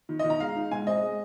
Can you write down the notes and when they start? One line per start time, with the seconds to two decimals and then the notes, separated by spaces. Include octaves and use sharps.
0.09 D#3
0.19 D#5
0.24 D#3
0.30 A#5
0.40 G#3 F5
0.56 D#4
0.71 G#2 G#5
0.87 C4 D#5
1.02 G#3